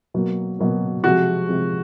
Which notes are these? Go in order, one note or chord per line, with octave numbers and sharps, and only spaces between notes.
B2 F#3 A#3
B2 F#3 A#3
C3 F3 G#3 F#4
C3 F3 G#3